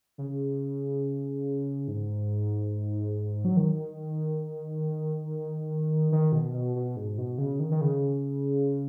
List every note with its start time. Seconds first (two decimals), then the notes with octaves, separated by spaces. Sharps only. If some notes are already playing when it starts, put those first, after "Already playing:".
0.18 C#3
1.88 G#2
3.45 F#3
3.57 D#3
6.12 D#3
6.32 B2
6.54 B2
6.76 B2
6.96 G#2
7.18 B2
7.38 C#3
7.59 D#3
7.71 D#3
7.81 C#3